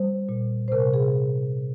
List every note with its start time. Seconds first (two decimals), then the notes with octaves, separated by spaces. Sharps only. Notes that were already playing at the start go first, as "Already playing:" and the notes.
Already playing: G3 C5
0.29 A#2
0.68 C5
0.72 C3 A#4
0.94 G#4